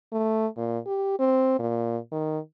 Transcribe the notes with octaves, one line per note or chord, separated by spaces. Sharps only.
A3
A#2
G4
C4
A#2
D#3